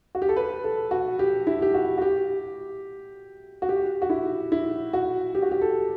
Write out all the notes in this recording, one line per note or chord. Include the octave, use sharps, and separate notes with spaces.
F#4
G4
A4
B4
A4
F#4
G4
E4
G4
F#4
F#4
G4
F#4
G4
F#4
E4
E4
F#4
G4
F#4
G4
A4